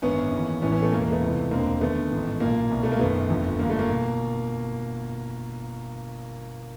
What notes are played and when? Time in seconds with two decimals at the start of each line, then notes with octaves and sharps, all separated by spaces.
0.02 G#1 F#2 D3 B3 C#4
0.32 D#2 C#3 E3
0.62 A1 A2 E3 B3 C#4
0.72 B3 C#4
0.82 A3 B3
0.92 E1 E2 C#3 E3 A#3
1.02 A#3
1.11 A3 B3
1.22 C#2 C3 E3
1.51 E1 D2 D3 A#3 C4
1.81 D#2 D3 A3 B3
2.10 A1 G#2 D#3
2.40 B1 A#2 A#3
2.70 C2 B2
2.83 A3
2.92 A#3
2.99 F#1 F#2 D#3 A3 B3
3.30 G1 F2 D3
3.59 G1 G2 D3 A#3
3.70 A3
3.79 A#3
3.90 B2